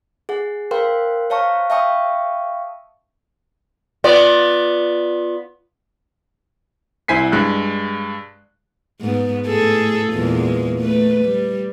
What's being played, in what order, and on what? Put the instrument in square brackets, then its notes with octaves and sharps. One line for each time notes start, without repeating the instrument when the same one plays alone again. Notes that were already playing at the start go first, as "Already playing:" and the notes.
[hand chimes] G#4 F#5
A#4 C5 F5 G5 C6
C5 C#5 F5 A5 A#5 C#6
E5 F5 G5 A5 C#6 D#6
[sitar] B3 F4 D5
[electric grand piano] C2 E4 C5 G#5 B6 C7
G2 G#3 F#6
[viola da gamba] G#2 B3
A2 G#4 A4
E2 A#2 G#3
A3 B4
G3